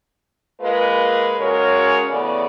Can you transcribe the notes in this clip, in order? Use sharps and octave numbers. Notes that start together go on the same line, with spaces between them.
G#3 A#3 F4 A#4 B4
C#3 G#3 C#4 F#4 A#4 C#5
E2 C#3 A3 B3 D5